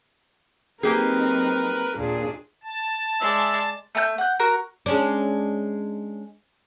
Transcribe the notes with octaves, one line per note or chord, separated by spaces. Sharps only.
F#3 A#3 C4 D#4 G4 G#4 A#4 B4
D#2 A#2 D4 G#4
A5
G#3 D5 E5
A3 A5 G6
F#5 G6
F#4 A#4
G#3 C#4 D4